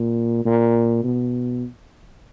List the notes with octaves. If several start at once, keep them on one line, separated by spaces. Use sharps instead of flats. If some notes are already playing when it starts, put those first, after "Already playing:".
Already playing: A#2
A#2
B2